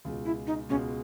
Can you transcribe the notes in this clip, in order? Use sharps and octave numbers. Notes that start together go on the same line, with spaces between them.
C#2 B2 G#3
E4
D#4
C#2 B2 G#3 C#4